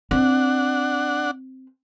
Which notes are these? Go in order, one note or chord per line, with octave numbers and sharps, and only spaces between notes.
C4 D4 F#5